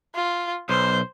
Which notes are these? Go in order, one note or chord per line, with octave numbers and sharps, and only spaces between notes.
F4
B1 C5